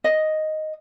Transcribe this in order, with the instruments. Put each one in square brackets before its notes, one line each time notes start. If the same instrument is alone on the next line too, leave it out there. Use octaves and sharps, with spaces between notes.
[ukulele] D#5